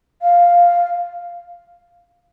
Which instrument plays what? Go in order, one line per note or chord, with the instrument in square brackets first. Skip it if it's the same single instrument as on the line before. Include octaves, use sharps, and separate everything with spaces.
[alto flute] F5